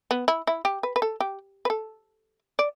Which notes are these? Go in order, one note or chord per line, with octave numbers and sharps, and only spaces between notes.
B3
E4
E4
G4
B4
B4
A4
G4
B4
A4
D5